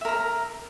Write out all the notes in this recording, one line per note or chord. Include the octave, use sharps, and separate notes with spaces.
A#4 E5 A#5